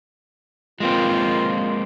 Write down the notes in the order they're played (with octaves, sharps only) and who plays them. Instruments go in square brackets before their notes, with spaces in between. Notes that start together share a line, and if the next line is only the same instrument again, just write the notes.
[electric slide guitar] G#3 A#3 C4 [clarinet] F4